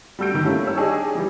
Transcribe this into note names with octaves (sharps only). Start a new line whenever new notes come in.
G3 A3 F#4 E6 G6 D7
D3 D#3
G3 A3 A#3 C#4 E4 F4
G3 C#5 E6
D4 D#4 G4 G#4 A5
E3 G3